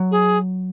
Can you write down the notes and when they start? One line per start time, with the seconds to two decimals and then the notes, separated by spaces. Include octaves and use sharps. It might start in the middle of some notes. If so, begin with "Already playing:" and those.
Already playing: F#3
0.11 G#4